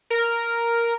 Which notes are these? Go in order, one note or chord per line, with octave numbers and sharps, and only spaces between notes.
A#4